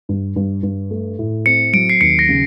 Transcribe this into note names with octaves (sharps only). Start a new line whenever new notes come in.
G2
G2
G2
A3
A2
C4 C#7
F#3 D7
C7
D#2 C#7
A#6
C#3